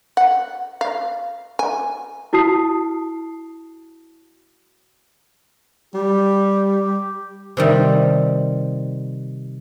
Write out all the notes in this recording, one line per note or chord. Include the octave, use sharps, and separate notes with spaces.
F#5
F5
G#5
E4 F#4 A5 D#6 C7
G3 G4
C3 D#3 G3